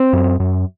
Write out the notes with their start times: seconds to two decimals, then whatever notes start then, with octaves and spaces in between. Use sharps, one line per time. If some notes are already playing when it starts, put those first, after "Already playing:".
Already playing: C4
0.13 F#2
0.40 F#2